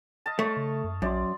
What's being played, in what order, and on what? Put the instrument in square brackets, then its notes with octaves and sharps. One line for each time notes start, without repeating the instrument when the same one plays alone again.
[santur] D#5 F5 A5
[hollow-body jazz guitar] A3 [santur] C#5
[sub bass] C#3
F#2
[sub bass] A#1 [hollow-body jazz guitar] F#2 [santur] D5 C6